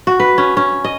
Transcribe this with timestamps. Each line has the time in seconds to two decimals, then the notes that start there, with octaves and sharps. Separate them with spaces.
0.07 F#4
0.20 B4
0.38 C#4
0.57 C#4
0.84 D#5